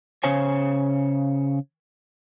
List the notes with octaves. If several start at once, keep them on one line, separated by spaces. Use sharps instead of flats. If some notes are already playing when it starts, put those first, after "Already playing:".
C#3 C5 C#5 G#5